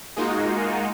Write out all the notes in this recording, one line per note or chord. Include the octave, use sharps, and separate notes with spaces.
G#3 A#3 D#4 F4 F#4